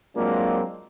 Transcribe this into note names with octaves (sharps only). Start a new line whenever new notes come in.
F#3 G#3 A#3 C4 D4 F4